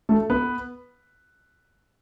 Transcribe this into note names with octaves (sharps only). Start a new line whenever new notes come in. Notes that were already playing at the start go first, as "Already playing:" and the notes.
A3 A4
B3 B4